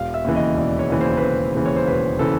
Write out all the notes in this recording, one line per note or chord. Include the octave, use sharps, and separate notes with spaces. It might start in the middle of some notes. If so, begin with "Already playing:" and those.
Already playing: E1 F5
E5
D#2 C#3 E3
D#5
E1 D5
C#5
D#2 C#3 E3
C5
B4
E1 C5
D#2 C#3 E3
C#5
C5
E1 B4
C#3 E3 A4